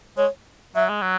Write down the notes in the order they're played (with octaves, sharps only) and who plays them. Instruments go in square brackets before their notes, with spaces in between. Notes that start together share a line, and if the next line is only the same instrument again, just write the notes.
[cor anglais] G#3 [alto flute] C#5
[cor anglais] F#3 [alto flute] E5
[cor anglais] G#3
F#3